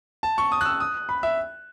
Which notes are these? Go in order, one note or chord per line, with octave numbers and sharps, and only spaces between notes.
A5
C#6
D#6
F#6
E6
D#6
B5
E5